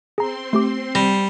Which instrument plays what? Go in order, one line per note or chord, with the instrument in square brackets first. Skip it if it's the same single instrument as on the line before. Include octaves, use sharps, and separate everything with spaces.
[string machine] C4 C6 [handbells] G#4 A#5
[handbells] A3 G4 D6
[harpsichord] G3 [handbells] A#6